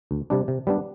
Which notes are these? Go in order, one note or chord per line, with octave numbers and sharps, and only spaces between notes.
D2
C3 G3 D4
C3
G3 B3 D4